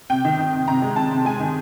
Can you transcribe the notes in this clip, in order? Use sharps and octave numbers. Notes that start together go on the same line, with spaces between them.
C3 G5
D#3
D#3
C3
C3 A#5
G#3
C3 A5
C3
G#3 G#5
D#3